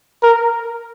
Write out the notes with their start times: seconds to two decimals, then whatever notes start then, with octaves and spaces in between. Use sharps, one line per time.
0.23 A#4